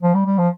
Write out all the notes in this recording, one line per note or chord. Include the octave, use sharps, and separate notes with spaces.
F3
G3
G3
F3